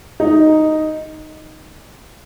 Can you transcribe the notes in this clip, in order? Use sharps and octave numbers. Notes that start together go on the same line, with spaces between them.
D#4